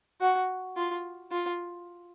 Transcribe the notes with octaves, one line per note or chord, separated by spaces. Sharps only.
F#4
F4
F4